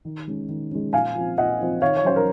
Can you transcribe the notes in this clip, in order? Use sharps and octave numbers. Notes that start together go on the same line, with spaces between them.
D#3
G#3 C#4
D#3
G#3 C#4
A#2 F5 G#5
F3 C4
A#2 D#5 F#5
F3 C4
D#3 C#5 F5
C#5
F#3 C#4 C5
A#4